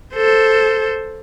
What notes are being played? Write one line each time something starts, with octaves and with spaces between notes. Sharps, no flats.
A4 C5